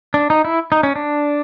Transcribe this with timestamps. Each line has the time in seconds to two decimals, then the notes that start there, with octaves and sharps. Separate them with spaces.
0.14 D4
0.30 D#4
0.45 E4
0.72 D#4
0.83 C#4
0.96 D4